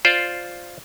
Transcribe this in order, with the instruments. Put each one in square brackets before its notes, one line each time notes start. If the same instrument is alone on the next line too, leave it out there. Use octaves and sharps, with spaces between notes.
[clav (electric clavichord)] F4 C5 D5